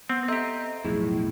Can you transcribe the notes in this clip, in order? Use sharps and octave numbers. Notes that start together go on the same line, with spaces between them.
B3 C4
C4 G4 A4 D#5 E5 A#5
B1 F2 A2 E4 G#4